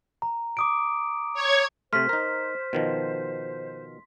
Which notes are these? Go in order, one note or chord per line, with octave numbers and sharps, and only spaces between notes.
A#5
D6 D#6 D7
C#5 G#6
C3 A3 C5 C6 F6 B6
D#4 A#4
B2 D#3 F3